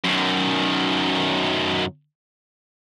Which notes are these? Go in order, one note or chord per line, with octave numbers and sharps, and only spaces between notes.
F#2 D#3